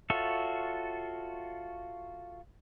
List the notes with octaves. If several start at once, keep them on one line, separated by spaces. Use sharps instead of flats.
F4 F#4 A4 C#5 E5